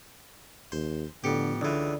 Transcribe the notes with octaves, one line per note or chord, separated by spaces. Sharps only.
D#2 C5
F2 A2 D3 B3 G4 C#7
C#2 D3 E3 D5